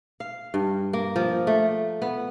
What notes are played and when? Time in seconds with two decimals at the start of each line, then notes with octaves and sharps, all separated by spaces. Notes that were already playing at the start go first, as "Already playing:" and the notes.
0.20 F5
0.54 G2
0.93 A#3
1.16 F3
1.47 A3
2.02 B3